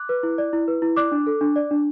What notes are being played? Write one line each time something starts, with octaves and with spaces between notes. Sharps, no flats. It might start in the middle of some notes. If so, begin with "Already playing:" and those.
Already playing: D6 F#6
B4
E4
D5
E4
B4
E4
D5 D6 F#6
D4
A4
D4
D5
D4